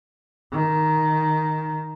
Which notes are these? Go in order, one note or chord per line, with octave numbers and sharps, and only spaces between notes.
D#3